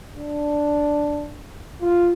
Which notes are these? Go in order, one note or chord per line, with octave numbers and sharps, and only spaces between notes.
D4
F4